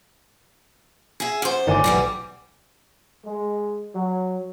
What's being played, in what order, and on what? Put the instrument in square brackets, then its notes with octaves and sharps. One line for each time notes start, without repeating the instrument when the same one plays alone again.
[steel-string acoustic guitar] G#4 E5
F#2 C5
[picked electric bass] G1 A2 D#3 [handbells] D5 G#5 D6
[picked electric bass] B1 [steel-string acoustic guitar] E3 G3 B3
[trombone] G#3
F#3